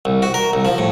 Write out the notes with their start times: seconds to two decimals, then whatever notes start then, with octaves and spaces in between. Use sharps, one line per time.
0.05 C2
0.22 F#4
0.34 A#4
0.53 C2
0.65 F3
0.78 A2